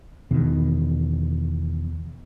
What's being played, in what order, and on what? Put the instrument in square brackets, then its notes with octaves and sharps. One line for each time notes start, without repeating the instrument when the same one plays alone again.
[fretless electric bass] E2 B2 D#3